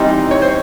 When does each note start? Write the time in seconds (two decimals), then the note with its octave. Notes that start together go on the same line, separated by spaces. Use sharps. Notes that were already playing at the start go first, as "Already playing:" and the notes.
Already playing: E3 G3 C4 D#4 C5
0.31 C#5
0.42 C5